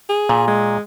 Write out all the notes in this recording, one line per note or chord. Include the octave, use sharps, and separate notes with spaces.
G#4
A#2
G#3